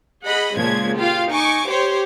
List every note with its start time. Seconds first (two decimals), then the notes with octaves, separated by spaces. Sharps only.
0.24 G#4 D#5 F#5 B5
0.57 A#2 C#3 F3 G#3 G#6
0.96 F4 G4 F5
1.29 D#4 G#5 C#6 D6
1.68 G4 C5 C#5